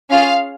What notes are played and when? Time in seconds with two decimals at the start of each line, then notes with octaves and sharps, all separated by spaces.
0.09 C#4 F4 G#4 F5